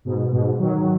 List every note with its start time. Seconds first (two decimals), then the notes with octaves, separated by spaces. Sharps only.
0.05 G#2 B2
0.31 G#2 B2
0.59 D#3 F#3